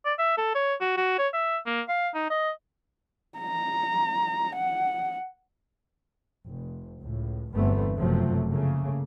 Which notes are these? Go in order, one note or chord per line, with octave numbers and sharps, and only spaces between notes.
D5
E5
A4
C#5
F#4
F#4
C#5
E5
A#3
F5
D#4
D#5
A#5
F#5
F1
C#2 A2
G1 E2 G2 A3 B3 C4
F#1 C3 F3 F#3 A3
C#3 A3 A#3